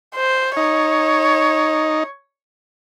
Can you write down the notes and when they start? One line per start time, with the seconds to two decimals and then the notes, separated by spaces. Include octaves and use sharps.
0.15 C5
0.57 D#4 C#5